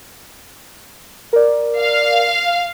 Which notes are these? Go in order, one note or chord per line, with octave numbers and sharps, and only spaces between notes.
A#4 D5
F5